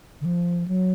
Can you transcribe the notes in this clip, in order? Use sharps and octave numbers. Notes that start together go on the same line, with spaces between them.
D3
F3
F#3